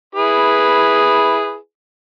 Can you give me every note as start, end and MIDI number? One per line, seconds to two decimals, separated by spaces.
0.15 1.56 64
0.15 1.56 68
0.15 1.56 71